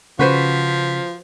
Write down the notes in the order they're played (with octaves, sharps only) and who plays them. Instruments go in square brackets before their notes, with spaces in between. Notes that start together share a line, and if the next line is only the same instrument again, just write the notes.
[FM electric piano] C#3 B6 [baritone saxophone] F3 [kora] F#4 B4 C5